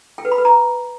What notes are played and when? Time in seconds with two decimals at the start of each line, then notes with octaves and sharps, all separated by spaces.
0.18 G5
0.25 B4
0.32 B5
0.38 B4
0.45 A#5